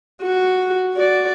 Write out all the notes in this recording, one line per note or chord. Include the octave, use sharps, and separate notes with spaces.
F#4
F#4 D5